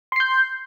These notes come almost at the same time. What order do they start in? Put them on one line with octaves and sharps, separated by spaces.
C6 C7 G6